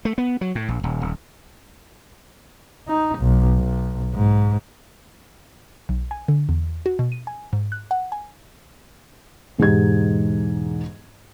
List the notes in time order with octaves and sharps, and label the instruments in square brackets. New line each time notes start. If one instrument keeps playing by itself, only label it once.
[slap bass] A3
B3
F#3
A2
A#1
D#1
D#1
[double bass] D#4
B1
B1
G#2
[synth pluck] B1
G#5
D3
E2
F#4
B2
D#7
G#5
G#2
F#6
F#5
G#5
[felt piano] E1 G#2 G#3 D#4 G4 G#6